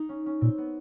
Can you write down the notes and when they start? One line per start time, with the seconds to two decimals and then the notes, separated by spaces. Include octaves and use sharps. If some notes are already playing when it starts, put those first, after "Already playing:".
Already playing: D#4
0.09 C#4
0.26 C#4
0.41 A#2 C4
0.58 B3